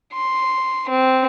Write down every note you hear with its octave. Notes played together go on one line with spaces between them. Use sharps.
C6
C4